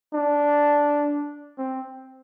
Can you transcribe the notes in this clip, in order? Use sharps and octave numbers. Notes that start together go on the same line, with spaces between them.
D4
C4